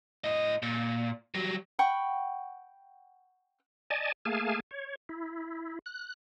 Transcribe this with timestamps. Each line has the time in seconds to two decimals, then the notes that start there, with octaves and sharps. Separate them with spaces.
0.24 A2 D#5
0.63 A#2
1.35 F#3 G3
1.79 F#5 G5 B5 C#6
3.90 D5 D#5 G#5 A5
4.25 A3 A#3 G#4 F5 G#5 A5
4.71 C#5
5.09 E4
5.86 F#6